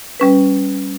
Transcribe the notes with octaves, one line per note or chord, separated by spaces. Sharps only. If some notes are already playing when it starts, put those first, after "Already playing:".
G3 C#4 B4